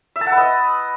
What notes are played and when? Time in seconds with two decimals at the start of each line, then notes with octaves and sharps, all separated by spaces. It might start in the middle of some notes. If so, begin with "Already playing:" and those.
0.16 E5
0.21 A5
0.27 F#5
0.32 B4
0.38 D#5